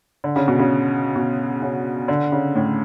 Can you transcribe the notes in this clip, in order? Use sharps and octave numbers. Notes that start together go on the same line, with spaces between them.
D3
C#3
B2
C#3
B2
C#3
D3
C#3
A2